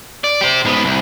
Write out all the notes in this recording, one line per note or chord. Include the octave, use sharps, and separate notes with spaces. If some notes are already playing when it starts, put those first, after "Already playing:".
D5
G4 C5
G#2 B3
C2